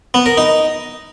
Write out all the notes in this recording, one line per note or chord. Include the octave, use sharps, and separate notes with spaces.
B3
A#4
D#4